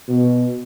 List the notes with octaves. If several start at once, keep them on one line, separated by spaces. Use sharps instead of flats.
B2